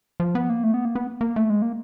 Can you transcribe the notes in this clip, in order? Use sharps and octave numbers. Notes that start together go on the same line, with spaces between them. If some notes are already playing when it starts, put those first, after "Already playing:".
F3
B3
A#3
A3
B3
A#3
B3
A#3
A3
G#3
A#3